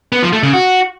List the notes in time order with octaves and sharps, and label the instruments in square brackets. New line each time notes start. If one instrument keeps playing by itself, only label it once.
[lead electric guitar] B3
F3
A3
C#3
F#4